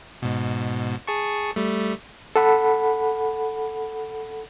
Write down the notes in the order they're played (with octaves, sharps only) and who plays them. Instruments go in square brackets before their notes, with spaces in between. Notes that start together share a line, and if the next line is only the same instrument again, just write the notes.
[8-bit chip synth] G#2 B2
G#4 A5 C#6
G3 A3
[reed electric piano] A4 F#5 B5